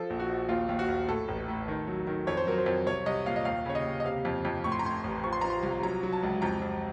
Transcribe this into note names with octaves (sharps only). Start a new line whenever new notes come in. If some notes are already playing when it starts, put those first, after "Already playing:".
Already playing: F3 A4
A#1
F#4
A#1
D#2 F4
D#2
F#4
D#2
A2 A4
A1
A2
D#3
F#3
D#3
F2 C#5
C5
F#3 A#4
C5
F2
C2 C#5
C2 D#5
A#2 F5
D#5
D#2 F5
C#3 C#5
D#5
D#2
D#5
C3 F5
F2
F2
A2 C#6
C6
A#5
A2 C6
A1
F3 C#6
C6
F3 A#5
C6
C2
F#3 A#5
F#3
A5
C#2
F2 A#5
F2